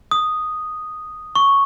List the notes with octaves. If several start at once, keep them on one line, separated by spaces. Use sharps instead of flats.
D#6
C#6